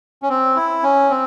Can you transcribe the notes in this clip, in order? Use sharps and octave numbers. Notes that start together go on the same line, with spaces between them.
C#4
C4
E4
C#4
C4